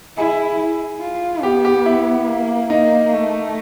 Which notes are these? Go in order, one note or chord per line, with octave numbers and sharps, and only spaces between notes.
E4 G#4
F4
B3 G4
G4
E4
A#3
A#3 D#4
A3